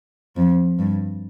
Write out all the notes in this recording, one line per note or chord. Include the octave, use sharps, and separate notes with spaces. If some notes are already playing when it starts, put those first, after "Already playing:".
F2
G2